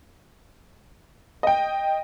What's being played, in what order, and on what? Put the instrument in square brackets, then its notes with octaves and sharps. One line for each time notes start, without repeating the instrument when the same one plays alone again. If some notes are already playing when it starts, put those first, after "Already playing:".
[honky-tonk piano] D#5 G5